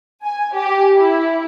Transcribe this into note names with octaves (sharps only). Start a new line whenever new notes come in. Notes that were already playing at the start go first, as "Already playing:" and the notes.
G#5
G4
E4